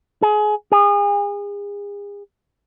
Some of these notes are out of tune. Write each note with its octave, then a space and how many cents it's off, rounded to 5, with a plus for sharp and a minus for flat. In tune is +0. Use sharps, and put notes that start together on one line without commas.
G#4 +25
G#4 -35